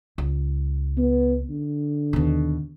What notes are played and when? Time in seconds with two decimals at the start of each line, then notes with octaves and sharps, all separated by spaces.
0.18 C#2
0.97 B3
1.50 D3
2.13 D#2 B2